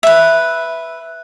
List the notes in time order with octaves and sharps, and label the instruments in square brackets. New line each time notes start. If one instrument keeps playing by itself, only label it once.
[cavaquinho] B4 E5